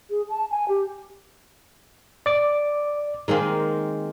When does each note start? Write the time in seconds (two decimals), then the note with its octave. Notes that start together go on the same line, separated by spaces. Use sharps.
0.10 G#4
0.29 A5
0.51 G#5
0.68 G4
2.26 D5 D6
3.28 D#3 G#3 A#3 C4